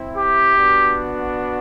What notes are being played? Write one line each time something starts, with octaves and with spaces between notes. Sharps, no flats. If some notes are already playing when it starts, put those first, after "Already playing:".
Already playing: C4 E4
G4
B3 D4 F#4